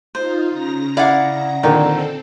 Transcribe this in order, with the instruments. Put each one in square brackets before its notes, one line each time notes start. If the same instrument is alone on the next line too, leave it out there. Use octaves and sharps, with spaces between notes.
[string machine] D#4 F4 [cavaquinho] C5
[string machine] C#3 A#5 A#6
[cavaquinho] E4 F5 [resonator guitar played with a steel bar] D5 F#5
[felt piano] A#2 D3 D#3 [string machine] C4 A4 [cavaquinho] D#4